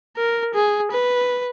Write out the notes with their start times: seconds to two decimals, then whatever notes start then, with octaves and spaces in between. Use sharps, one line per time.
0.17 A#4
0.55 G#4
0.91 B4